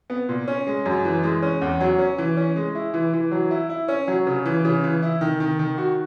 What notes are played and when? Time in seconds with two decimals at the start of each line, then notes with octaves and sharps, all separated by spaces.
0.10 B3
0.29 A#2
0.47 C#4
0.67 G#3
0.86 F#2
1.05 E3
1.23 G#3
1.42 C#4
1.62 E2
1.81 F#3
1.99 C#4
2.18 E3
2.37 C#4
2.56 G#3
2.75 E4
2.94 E3
3.13 E3
3.31 F#3
3.51 E4
3.69 E4
3.88 C#4
4.08 F#3
4.27 C#3
4.45 E3
4.65 C#3
4.84 E3
5.02 E4
5.21 D#3
5.40 D#3
5.59 D#3
5.78 F#4